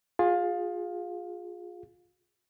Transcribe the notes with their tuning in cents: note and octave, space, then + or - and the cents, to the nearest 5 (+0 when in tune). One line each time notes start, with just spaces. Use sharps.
F4 +20 G#4 -10 F5 +20